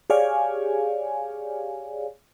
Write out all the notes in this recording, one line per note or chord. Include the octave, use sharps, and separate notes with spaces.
G4 G#4 C#5 D5 F5 G#5